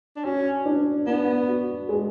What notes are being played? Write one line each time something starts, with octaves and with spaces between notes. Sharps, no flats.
D4
C#4 F#4
D4
B3 D4
F#4
G#3